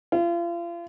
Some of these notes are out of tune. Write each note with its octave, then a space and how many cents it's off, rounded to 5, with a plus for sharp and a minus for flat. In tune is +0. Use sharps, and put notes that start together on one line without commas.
F4 -35